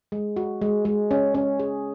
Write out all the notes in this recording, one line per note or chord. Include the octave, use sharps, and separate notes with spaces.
G#3
F#4
G#3
G#3
C#4
C#4
G#4